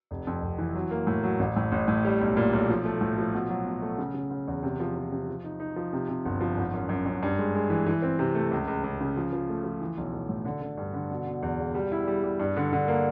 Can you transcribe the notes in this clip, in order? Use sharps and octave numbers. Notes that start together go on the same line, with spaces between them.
F1
F2
F1
E3
F#3
A#3
A2
F#3
A1
A2
A1
A2
G3
B1
A#2
B1
F3
A3
A2
F3
B2
F#3
B2
A3
C#3
C#3
C#3
E2
C3
F3
F3
C3
F3
D#4
D#4
F3
C3
C3
G1
F3
G#1
F#2
F#2
F#2
G2
G#3
G#3
E3
E3
C4
C3
A3
C#2
C#2
C#2
C#3
F3
F3
A3
F3
E3
B1
B1
A2
D3
D3
G2
D3
B2
B2
E2
E1
G3
E4
G3
G3
G2
D3
D3
A#3